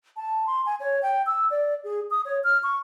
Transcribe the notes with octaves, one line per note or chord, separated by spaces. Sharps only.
A5
C6
G#5
C#5
G5
E6
D5
G#4
D#6
C#5
F6
C#6